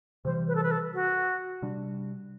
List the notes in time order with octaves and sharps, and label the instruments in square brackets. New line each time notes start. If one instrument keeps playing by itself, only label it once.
[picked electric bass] C3 E3 G3 [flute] C5
[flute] B4
A4
B4
A4
F#4
[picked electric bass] C3 G3 D4